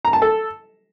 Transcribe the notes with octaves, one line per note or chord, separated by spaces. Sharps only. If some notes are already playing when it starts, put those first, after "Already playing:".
A#5
A5
A4